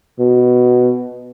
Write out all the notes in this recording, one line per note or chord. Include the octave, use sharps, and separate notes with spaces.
B2